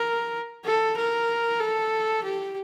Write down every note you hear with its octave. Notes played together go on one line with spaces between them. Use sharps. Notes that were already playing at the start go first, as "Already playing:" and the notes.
Already playing: A#4
A4
A#4
A4
G4